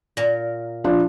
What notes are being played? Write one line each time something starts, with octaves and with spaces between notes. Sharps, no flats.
A#2 A#4
F3 D4